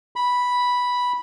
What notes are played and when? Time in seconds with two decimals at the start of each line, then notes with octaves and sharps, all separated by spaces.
0.16 B5